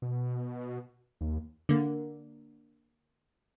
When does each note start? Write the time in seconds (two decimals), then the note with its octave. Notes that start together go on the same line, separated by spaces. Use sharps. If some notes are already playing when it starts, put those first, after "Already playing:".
0.02 B2
1.21 D#2
1.69 D3 A#3